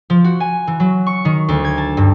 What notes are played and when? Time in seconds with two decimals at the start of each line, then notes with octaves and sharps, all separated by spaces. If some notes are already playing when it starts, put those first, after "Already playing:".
0.10 F3
0.24 F#4
0.40 G#5
0.67 E3
0.80 F#3
1.07 C#6
1.25 D#3
1.48 D2
1.65 G#6
1.78 A5
1.97 G2